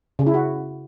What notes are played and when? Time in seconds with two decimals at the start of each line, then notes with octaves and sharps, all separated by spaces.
0.19 C#3
0.27 E4
0.34 F#4